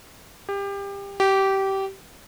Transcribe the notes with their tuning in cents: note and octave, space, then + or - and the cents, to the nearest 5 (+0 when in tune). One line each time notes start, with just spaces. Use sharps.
G4 +25
G4 -20